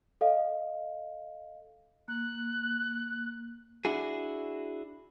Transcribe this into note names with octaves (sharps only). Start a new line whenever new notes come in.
A4 D#5 F5
A#3 F#6
D4 E4 F#4 G#4